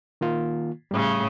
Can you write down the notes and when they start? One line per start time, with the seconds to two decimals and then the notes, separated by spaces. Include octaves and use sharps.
0.21 D#3 A#3 F4
0.91 A2 C#3 G3